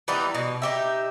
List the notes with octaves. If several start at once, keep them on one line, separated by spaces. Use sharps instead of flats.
E3 G3 B3 D#4
B2
D#4 G4 E5